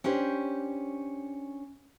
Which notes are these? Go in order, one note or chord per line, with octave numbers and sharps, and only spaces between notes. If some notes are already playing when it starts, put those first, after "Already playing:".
C#4 D4 G4 C5